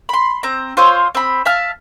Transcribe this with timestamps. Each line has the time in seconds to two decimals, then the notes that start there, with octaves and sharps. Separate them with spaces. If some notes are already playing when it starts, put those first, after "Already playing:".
0.09 B5 C6
0.43 C4 A#5
0.77 F4 C5 C#5 E6
1.15 C4 B5
1.45 E5 F5 A5 F6